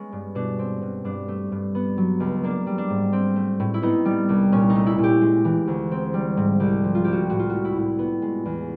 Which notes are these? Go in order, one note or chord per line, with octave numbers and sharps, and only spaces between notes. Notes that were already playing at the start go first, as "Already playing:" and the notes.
Already playing: G#3 B3 C#4
G2
B2 D4
C4
B2
G2 D4
A3
G2
B3
F#3
C#2
A#3 D4
G3
D4
G#2
C4
A3
A2
E4
B3 D#4
G3
C2
A#2 C#4
D#4
A3
E4
A#2
G4
G#3
E3
D2
C4
G3
G#2
C2 G4
F3
F4
C2 G4
F#4
A2 F#4
F4
A3 F#4
E4
A2
B3
G#3
E2